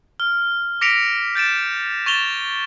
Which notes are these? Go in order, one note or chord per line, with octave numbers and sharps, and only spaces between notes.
F6
D6 A#6 B6 C#7 D7 F7
G6 A6 D7 E7
C#6 A6 E7 F7 G7